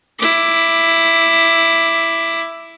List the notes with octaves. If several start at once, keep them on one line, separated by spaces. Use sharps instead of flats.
E4 D6